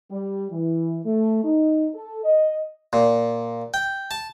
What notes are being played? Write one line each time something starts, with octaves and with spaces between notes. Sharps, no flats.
G3
E3
A3
D#4
A4
D#5
A#2
G5
A5